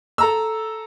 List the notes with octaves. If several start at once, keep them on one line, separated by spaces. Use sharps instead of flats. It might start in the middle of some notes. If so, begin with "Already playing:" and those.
A4 A#5 E6